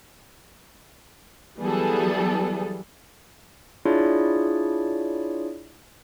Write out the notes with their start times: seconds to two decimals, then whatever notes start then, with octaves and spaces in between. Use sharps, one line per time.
1.59 E3 F#3 G3 B3 G#4 A4
3.85 D4 E4 F4 G#4 C#5 D5